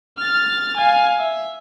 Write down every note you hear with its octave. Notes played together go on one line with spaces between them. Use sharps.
F6 A6
F5 G#5
E5